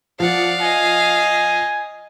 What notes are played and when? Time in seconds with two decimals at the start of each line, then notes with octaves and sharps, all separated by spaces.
0.20 F3 D5 F5 F#5
0.62 D#5 G#5